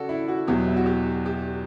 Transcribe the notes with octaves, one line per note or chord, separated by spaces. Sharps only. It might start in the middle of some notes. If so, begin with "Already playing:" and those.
Already playing: C#3 F#4 A4 D5
E4
F#4
E2 B2 F#3 G4
E4
F#4
G4
G4